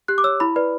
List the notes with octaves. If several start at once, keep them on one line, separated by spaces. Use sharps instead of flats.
G4 F#6
D6
C#5 E6
E4 B5
B4 D5